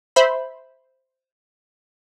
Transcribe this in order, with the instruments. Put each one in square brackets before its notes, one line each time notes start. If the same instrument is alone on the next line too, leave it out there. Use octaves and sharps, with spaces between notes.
[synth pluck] C5 E5 B5